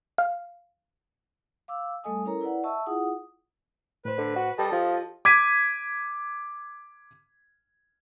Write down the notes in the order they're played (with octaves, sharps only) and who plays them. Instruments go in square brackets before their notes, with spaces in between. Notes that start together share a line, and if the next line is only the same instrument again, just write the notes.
[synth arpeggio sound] F5
[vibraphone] F5 D6 E6
G3 A3 A4 D#5 G#5 D#6
C#4 E4 A4 A#4 C#5 A#5
E4 B4 D5 F#5
D#5 E5 A5 C#6 E6
E4 F4 G#4 F#5 D#6
[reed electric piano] A2 C5 [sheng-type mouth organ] B4
[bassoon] D3
F#4
[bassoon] G3 [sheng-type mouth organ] A4 D#5 [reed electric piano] B4 A5
[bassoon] F3 [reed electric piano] F4 G4
[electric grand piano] D6 G#6 B6 D#7